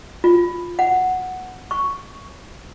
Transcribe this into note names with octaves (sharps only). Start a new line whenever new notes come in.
F4
F#5
C#6